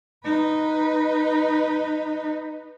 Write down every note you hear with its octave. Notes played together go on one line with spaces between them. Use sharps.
D#4 B4